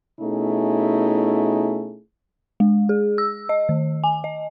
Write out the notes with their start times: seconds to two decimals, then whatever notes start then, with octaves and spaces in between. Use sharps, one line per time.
0.20 B2 A3 C#4 D#4 E4 G#4
2.60 G#3
2.89 G#4
3.18 E6
3.49 D#5
3.69 D#3
4.04 G#5
4.24 D#5